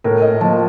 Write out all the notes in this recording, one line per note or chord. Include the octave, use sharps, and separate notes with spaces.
A2 A#4
D#5
F3 A#3 A5